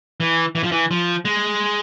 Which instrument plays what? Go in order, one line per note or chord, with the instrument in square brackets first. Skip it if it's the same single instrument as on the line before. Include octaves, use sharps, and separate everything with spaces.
[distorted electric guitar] E3
E3
F3
E3
F3
G#3